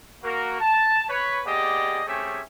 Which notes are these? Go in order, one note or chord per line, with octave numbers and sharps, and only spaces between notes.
A#3 F#4 A#4
A5
B4 C#5
A#3 B3 G4 G#4 D5 D#5
A3 C4 C#4 G4 G#4 E5